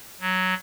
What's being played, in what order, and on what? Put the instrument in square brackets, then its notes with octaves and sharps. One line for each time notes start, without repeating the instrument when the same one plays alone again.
[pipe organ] F#3